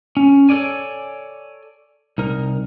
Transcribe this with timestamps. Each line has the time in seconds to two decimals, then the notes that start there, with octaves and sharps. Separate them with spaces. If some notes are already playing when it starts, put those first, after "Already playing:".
0.17 C#4
0.49 A4 A#4 C#5 D5 G#5
2.18 C2 D#4 A#4